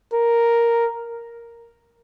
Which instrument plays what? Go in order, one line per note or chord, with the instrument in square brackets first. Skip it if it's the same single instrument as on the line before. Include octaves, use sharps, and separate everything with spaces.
[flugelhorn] A#4